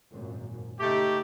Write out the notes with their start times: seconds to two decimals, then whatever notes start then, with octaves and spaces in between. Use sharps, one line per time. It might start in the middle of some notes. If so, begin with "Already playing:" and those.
0.12 G#1 F#2 A#2
0.80 C#3 A3 D#4 G4